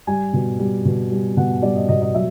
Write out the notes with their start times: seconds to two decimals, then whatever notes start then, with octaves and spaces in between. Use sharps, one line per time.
0.07 G3 G#5
0.33 B2
0.59 G3
0.85 B2
1.11 G3
1.37 B2 F#5
1.62 G3 D5
1.76 D#5
1.89 B2 D#5
2.02 D#5
2.14 F#3 E5